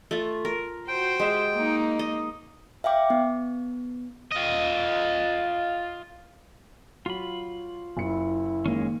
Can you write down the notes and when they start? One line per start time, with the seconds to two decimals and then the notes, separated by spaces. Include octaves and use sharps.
0.11 A3 F4
0.45 A#4
0.88 F#4 C5 G5
1.20 G#3 G4 E5
1.53 A#3 D#4
1.99 D#5
2.84 E5 F5 G5 D6
3.10 B3
4.31 F4 D#5
7.06 F#3 F4 B5
7.97 F#1 E4 C#7
8.66 D#3 G#3 A#3 C#4